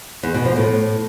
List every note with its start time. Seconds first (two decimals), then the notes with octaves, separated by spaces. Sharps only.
0.23 E2
0.34 B2
0.45 F3
0.56 A2